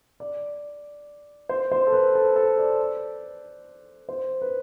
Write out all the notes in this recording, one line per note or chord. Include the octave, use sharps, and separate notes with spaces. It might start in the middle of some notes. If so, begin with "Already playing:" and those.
D5
C5
C5
A4
B4
A4
A4
D5
C5
B4